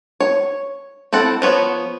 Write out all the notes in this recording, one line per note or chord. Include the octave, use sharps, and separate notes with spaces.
C#5
C4 E4 A4 F#5
F3 B3 C#5